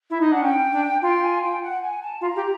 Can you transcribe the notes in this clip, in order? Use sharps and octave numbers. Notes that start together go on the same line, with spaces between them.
E4
D#4
D4 F#5
C#4 G5
D4
F4 G5
G#5
G5
F#5
G#5
A5
F4 A#5
G4